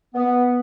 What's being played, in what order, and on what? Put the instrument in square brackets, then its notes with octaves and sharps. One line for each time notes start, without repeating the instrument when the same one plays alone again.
[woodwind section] B3